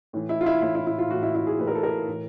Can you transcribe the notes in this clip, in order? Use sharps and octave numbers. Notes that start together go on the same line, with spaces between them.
A2 E3
E4
F4
E4
A2 E3 E4
E4
E4
F4
A2 E3 F#4
E4
E4
G#4
A2 E3 B4
A#4
A4
A#4
A2 E3